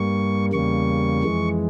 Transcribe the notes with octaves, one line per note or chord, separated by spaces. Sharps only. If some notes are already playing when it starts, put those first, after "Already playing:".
Already playing: G2 G3 A#3 C#6
E2 C#3 G3 A#3 C#6
F2 E3 G#3